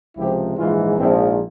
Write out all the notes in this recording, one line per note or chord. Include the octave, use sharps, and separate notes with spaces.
C#2 C3 F3 E4 G4
A#1 G#2 E3 C#4 F4
A#1 G#2 F3 C4 E4